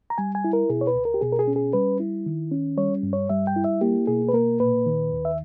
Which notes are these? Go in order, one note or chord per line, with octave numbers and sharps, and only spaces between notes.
A#5
G3 G#5
G#5
E4
A#4
B2 G#4
C#5
B4
C#2
A#4
G4
B2 G#4
A#4
G#4
C#4
G#4
G3 B4
E4
D#3
C#4
G3 C#5
G2
C#5
G3 E5
G5
E4
E5
A#3 G4
B2 G#4
B4
A#3 A#4
A#2 B4
D#3
D#2
E5